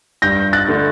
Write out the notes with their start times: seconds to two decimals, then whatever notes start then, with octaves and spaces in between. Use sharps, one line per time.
0.22 G2 G6 A#6
0.53 F#6 A6
0.68 D3 A3